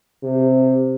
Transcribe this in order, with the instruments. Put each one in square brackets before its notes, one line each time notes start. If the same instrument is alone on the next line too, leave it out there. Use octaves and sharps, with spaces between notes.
[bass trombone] C3